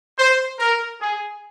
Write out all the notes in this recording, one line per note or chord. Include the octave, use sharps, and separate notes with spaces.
C5
A#4
G#4